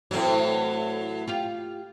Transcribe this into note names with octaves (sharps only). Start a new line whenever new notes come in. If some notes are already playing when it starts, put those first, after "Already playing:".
A2 E3 F#3 A3 C4
F4 G4 F5